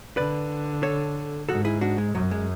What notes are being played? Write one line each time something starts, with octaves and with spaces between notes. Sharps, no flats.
D3 B4 D5
A4 C#5
G#2 F#4 A4
E4 G#4
D4 F#4
G#3
F#2 F#3
G#3